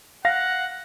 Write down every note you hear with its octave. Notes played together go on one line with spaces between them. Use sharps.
F5 F#5 A#6